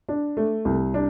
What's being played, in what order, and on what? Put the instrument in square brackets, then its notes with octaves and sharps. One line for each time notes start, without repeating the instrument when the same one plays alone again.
[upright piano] D4
A3
C2
D4